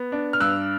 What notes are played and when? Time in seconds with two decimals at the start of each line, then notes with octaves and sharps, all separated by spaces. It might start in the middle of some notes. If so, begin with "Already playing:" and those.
Already playing: B3
0.12 D4
0.33 F6
0.40 G2 E6 F#6